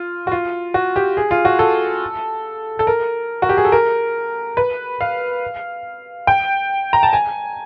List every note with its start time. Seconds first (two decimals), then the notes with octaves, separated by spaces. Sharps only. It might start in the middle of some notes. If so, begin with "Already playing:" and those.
Already playing: F4
0.27 F#4
0.31 F4
0.74 F#4
0.96 G4
1.17 G#4
1.31 F4
1.45 F#4
1.59 A4
2.79 A4
2.87 A#4
3.42 F#4
3.49 G4
3.57 G#4
3.65 A4
3.72 A#4
4.57 B4
5.01 F5
6.27 G5
6.93 A#5
7.03 A5
7.13 G#5